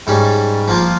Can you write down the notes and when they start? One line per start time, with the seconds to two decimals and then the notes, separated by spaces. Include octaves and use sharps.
0.07 G#2 G3 C#4
0.68 F3 A#3 F4